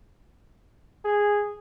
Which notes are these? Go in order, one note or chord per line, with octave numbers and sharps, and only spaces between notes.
G#4